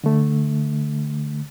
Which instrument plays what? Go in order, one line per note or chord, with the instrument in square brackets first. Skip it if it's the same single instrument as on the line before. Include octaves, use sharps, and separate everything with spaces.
[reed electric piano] D3 A3